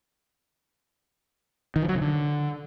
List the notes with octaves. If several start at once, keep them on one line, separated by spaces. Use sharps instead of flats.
D#3
F3
F#3
C#3
D3